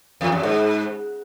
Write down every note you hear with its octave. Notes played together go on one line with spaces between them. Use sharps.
E2
F#2
G#2